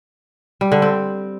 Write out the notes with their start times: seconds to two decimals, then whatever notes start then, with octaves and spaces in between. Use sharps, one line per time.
0.61 G3
0.72 D3
0.82 C4